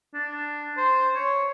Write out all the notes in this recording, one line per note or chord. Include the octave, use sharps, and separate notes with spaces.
D4
C5
C#5